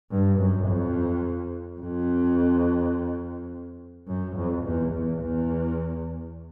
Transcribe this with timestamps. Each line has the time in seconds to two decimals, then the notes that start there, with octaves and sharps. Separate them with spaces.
0.11 G2
0.39 F#2
0.67 F2
1.81 F2
4.08 F#2
4.36 F2
4.64 E2
4.93 E2
5.21 E2